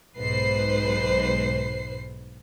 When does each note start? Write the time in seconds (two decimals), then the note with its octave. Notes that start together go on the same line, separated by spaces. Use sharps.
0.16 B1 G#2 B4 C5 C7